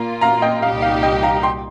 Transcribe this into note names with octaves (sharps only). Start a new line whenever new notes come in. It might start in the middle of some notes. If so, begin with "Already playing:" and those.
Already playing: A#2 A#3 F4 A#5
F5 A#5
D#5 G5
C2 A#2 G3 D#4 G4 F5
F5
D#5 G5
F5 A#5
G5 C6